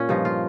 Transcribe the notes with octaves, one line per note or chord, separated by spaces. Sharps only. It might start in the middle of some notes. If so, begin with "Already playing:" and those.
Already playing: A#2 C#4
G2 F3 D#4
F4